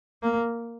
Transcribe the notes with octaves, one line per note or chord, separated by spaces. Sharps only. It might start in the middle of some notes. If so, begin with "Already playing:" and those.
A#3